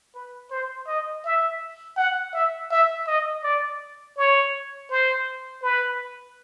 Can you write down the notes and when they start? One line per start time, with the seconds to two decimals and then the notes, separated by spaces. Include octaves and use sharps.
0.15 B4
0.51 C5
0.88 D#5
1.25 E5
1.97 F#5
2.34 E5
2.71 E5
3.07 D#5
3.44 D5
4.17 C#5
4.90 C5
5.63 B4